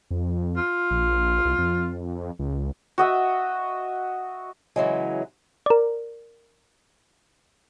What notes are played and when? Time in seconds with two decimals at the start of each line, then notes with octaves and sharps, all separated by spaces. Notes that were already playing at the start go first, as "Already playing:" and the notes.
0.10 F2
0.57 F4
0.91 A#1
1.45 C2
1.58 F2
2.39 C#2
2.98 F#4 D#5 E5
4.76 C#3 E3 F#3 G#3
5.66 A#4 D5